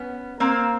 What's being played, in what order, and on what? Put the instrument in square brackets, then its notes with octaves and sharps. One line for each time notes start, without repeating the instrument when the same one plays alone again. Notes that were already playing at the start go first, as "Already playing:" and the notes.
Already playing: [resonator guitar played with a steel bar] B3 C#4
A#3 C4